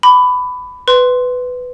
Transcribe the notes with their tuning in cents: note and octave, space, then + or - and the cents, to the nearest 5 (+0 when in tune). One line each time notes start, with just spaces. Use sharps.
B5 +15 D6 +0
B4 +15 C6 +0